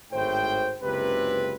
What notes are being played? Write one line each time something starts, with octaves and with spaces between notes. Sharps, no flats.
G#1 A2 C5 G5
F#1 C#2 C3 G4 B4